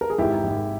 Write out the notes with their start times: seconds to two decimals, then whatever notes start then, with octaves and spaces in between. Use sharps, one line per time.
0.01 A#4
0.10 G#4
0.18 G#1 E4 G4
0.44 G#1